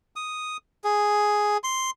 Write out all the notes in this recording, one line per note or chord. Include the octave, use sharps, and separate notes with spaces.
D#6
G#4
C6